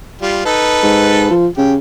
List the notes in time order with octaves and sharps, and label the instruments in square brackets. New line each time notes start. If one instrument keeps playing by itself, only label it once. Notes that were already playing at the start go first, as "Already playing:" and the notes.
[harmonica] G3 F4
D#4 A4 B4
[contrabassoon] G#2
F3
[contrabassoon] C#3 [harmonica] G4